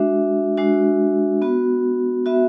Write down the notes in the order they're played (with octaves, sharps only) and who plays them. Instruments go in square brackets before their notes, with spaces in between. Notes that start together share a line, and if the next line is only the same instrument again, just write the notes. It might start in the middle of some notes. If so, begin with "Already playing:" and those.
Already playing: [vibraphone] G#3 D4 F#4 E5
G#3 D4 F#4
B3 F#4
B3 F#4 E5